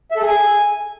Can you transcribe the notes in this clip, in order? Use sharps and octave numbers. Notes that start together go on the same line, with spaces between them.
E5
A4
G#4
G#5